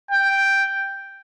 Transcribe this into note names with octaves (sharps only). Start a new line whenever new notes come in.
G5